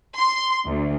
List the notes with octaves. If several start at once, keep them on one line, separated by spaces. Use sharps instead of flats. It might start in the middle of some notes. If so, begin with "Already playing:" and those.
C6
D2